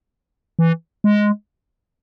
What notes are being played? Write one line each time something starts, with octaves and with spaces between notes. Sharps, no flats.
E3
G#3